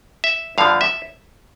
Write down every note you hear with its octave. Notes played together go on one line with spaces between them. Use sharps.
E5
G2 D3 F3 F5
E5